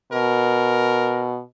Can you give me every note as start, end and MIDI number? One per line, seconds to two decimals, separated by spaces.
0.12 1.40 47
0.12 1.32 70